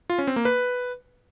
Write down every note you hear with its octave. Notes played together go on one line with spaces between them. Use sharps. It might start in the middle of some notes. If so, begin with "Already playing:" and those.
F4
C#4
C4
A#3
B4